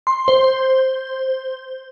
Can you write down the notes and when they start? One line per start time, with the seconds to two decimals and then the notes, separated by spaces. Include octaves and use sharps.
0.07 C6
0.28 C5